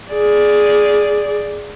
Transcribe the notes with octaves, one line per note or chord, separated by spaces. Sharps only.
G#4 D5